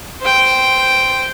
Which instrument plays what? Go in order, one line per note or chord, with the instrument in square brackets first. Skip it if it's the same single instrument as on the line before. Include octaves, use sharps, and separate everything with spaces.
[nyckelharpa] C5 G5